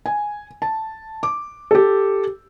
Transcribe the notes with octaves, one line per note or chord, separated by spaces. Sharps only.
G#5
A5
D6
G4 A4